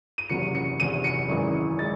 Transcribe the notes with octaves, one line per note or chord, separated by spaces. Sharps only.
D#7
F#1 E2 C3 F#3 C#7
C#7
F#1 E2 C3 F#3 D#7
C#7
G#1 F#2 E3 G#3
E3 G#3 A6